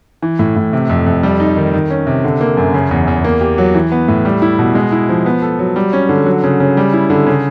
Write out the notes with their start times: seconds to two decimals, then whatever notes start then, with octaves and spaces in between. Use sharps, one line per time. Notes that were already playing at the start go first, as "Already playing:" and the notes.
0.22 E3
0.39 A2
0.56 A2
0.73 C3
0.89 F2
1.06 F2
1.23 G3
1.40 D#4
1.57 D#3
1.74 D#3
1.91 C#4
2.07 C3
2.24 D3
2.41 A#3
2.57 F#2
2.74 C#3
2.91 E2
3.08 E2
3.24 A#3
3.41 G4
3.58 F#3
3.75 E3
3.92 B3
4.08 A2
4.25 G3
4.42 E4
4.59 B2
4.75 G#3
4.92 E4
5.09 F3
5.26 B3
5.42 A4
5.59 F#3
5.76 G3
5.93 C#4
6.09 D3
6.26 F#3
6.44 C#3
6.60 C#3
6.77 G3
6.93 E4
7.10 D3
7.26 C#3